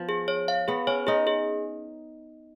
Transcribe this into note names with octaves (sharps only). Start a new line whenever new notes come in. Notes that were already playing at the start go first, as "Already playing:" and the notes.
Already playing: F3 B3
G#4
C#5
F5
B3 G#4
C#4 C#5
D#4 G#4
G#4